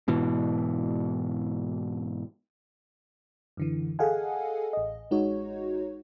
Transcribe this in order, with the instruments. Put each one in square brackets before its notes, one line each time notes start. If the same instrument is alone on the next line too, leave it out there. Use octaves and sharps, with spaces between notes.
[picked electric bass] G#2 B2 E3
[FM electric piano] F#2 D3 E3
G#4 A4 D#5 F5 F#5 G#5
A1 D#5
A1 G#3 D#4 F#4 C#5